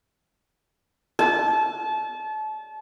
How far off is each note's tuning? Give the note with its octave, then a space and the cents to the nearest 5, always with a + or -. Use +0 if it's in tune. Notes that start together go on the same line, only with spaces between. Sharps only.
A5 -30